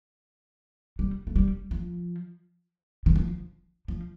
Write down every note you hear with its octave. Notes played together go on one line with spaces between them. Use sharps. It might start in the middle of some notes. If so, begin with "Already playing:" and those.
G3
A3
G3
F3
D#3
F3
F3